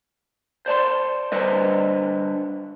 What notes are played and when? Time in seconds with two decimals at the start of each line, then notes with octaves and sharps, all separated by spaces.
0.66 C5 D5 A5 C6
1.32 D3 G3 B4 C5 D#5